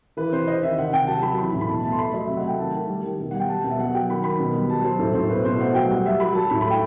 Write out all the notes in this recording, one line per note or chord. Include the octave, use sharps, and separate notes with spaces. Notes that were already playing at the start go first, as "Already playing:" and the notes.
E3 B4
C3 C5
C3 D#5
D#3 E5
C3 F#5
C3 G5
F#3 A5
F#3 B5
E3 B5
A2
B5
B2 A5
A3 A5
C6
A3 B5
F#3 D#5
C3 E5
F#5
A3 G5
D#3 A5
D#3
G3
D#3
B2
G3 F#5
G5
G3 A5
B2
E5
F#3 F#5
F#3 G5
D#3 B5
D#3 B5
B2
G3
F#3 A5
F#3 C5
A2 A4
A2 C5
B2 B4
B2 C5
A3 F#5
F#3 G5
G3 F#5
G3 E5
F#3 B5
F#3 A5
A2 B5
B5
A3 G5